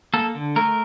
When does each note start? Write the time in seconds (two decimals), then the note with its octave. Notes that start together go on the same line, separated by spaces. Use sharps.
0.14 A#3 A4
0.35 D3
0.56 A3 A#4